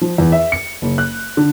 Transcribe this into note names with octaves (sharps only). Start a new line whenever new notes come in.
F3
E2
E5
C#7
F#1
F#6
D3